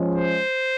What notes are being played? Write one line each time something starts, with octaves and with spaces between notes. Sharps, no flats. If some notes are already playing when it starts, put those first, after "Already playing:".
Already playing: F3 G#3 C#4
C5